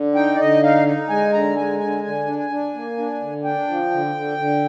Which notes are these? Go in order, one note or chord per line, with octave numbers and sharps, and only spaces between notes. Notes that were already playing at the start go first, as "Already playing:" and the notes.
Already playing: D3
D#4 G5
D5
D3 D#5
D#4 F5
D#4
G#3 G#5
D3 A#5
G#3 G#5
D3 G#5
D3 G#5
D4
G#5
D4
A#3
D4
D3
D4 G5
F3
D3
D3
D3